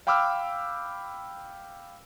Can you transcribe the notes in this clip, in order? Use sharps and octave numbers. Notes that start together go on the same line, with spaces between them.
F5 G5 B5 D6 E6 F6